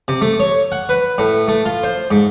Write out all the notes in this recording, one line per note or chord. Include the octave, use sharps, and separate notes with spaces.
C3
A3
C#5
F#5
B4
A2
A3
F4
C5
G#2